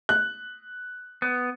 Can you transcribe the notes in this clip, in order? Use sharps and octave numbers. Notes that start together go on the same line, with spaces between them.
F#6
B3